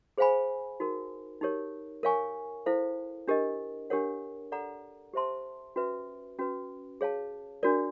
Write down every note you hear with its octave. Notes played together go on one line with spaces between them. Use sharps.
G#4 C5 F5 G#5 B5
D#4 F#4 A#4
D#4 G4 A#4 C#5
A#4 C#5 F5 G#5 C#6
E4 A4 C5 F5
D4 G4 A#4 D#5
D4 G4 A#4 C#5 F#5
A4 D5 F#5 A#5
G4 C5 E5 A5 C6
C#4 F#4 B4 E5
C#4 F#4 B4
G#4 C#5 F5 A5
D4 F#4 A#4 D5